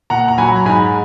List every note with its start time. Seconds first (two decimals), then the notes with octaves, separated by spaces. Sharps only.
0.10 A#2 F#5 A#5
0.28 A#5
0.38 F#3 G#5 B5
0.56 A#5
0.65 G#2 G#5 B5